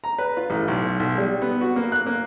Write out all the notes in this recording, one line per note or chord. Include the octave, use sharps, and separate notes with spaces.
A#5
B4
F4
A1
B1
B1
G3
B3
F#4
A#3
F#6
A#3